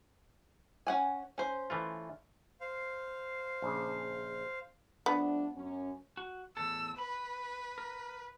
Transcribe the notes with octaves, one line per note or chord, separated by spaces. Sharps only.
C#4 F#5 G#5
C#4 C5
E3 A3 F4
C5 F5
A#1 C#3
F3 A3 B3 D4
F#2 C#4
F#4
E2 A2 A4 E6
B4 B5
A#4